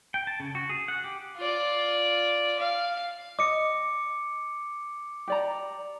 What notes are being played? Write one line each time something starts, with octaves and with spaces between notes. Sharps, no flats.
G5
A5
C#3
F#4
G#4
F#5
G4
F4 D5
F5
D#5 D6 C#7
G4 D5 A#5